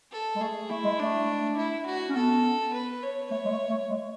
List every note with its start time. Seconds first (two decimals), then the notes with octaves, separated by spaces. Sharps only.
0.12 A4
0.36 G#3
0.41 A3 G#4
0.70 A3 E4
0.84 G#3
0.99 A3 D4
1.57 E4
1.86 F#4
2.09 C#4
2.16 B3 A4
2.74 B4
3.03 C#5
3.31 A3 C#5
3.45 G#3
3.51 A3
3.70 A3
3.90 G#3